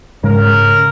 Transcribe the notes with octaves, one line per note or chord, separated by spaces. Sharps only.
G#2 C#3 G#3 A#4